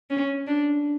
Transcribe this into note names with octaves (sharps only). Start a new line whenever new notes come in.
C#4
D4